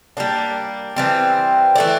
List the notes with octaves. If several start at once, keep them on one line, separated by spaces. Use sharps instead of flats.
G3 A#3 D4
E3 G3 C4
E3 A3 D4